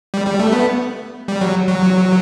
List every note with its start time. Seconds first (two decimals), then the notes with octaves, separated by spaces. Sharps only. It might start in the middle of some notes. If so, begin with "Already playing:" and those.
0.14 G3
0.27 G3
0.39 A3
0.52 B3
1.28 G3
1.41 F#3
1.68 F#3